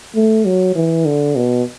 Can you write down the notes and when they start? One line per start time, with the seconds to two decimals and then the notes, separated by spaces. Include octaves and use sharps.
0.15 A3
0.45 F#3
0.75 E3
1.05 D3
1.36 B2